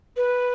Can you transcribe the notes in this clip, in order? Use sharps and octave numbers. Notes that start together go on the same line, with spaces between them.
B4